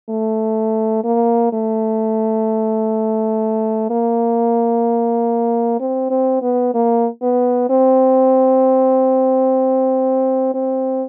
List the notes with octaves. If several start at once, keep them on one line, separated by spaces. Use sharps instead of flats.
A3
A#3
A3
A#3
C4
C4
B3
A#3
B3
C4
C4